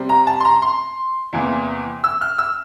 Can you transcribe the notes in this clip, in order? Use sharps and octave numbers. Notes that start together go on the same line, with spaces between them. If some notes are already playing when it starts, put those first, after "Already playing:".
Already playing: C3 G3 C4
A#5
A5
C6
A#5
C6
E2 C3 E3 A#3
E6
F6
E6